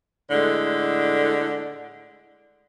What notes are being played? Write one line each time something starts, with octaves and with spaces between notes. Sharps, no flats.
A2 D3 G#3